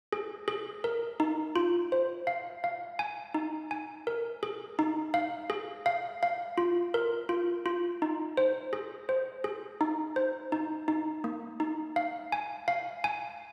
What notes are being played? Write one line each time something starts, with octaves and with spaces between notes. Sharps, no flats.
G#4
G#4
A#4
D#4
F4
C5
F5
F5
G#5
D#4
G#5
A#4
G#4
D#4
F5
G#4
F5
F5
F4
A#4
F4
F4
D#4
C5
G#4
C5
G#4
D#4
C5
D#4
D#4
A#3
D#4
F5
G#5
F5
G#5